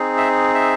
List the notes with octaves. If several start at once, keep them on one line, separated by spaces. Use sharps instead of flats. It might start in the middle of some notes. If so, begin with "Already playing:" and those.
Already playing: C4 D#4 G#4
E5
E5